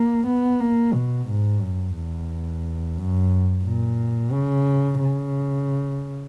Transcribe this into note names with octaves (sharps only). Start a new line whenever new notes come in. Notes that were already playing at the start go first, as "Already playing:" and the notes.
Already playing: A#3
B3
A#3
B2
G#2
F#2
E2
F#2
A#2
C#3
C#3